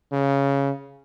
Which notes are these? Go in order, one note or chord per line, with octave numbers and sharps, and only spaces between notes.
C#3